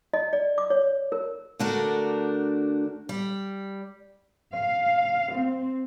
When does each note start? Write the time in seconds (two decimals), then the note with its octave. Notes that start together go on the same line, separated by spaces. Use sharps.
0.14 D#5
0.33 D5
0.58 D6
0.70 C#5
1.12 A#4
1.59 D3 A3 D4 F#4 A#4
3.09 G3
4.52 F5
5.34 C4